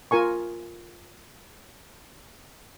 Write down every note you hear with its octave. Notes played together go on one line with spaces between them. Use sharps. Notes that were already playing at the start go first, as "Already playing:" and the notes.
F4 A#4 G#5 C#6